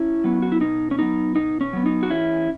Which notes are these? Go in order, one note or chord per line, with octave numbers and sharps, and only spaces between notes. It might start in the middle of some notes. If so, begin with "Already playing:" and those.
Already playing: C#4 E4
F#3 B3
F#4
E4
B2 D#4
C#4
F#3 B3 D#4
B2 D#4
C#4
F#3 B3
D#4
F#4
E2 C#4 E4